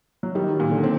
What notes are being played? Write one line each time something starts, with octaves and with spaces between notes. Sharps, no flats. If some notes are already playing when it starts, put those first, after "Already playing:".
F#3
D#3 G3
D#3
A#2
D3
C4